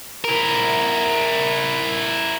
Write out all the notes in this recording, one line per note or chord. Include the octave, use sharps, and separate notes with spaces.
E4 A#4